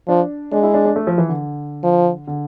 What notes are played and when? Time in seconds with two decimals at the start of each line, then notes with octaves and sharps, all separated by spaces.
0.08 F3 D4
0.52 G#3 D4
0.63 E4
0.74 D4
0.85 D4
0.96 A3
1.07 F3
1.18 E3
1.29 D3
1.84 F3
2.27 D3